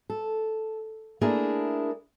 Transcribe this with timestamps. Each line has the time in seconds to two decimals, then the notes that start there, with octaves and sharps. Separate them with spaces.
0.10 A4
1.21 A3 A#3 D4 E4 G#4 A#4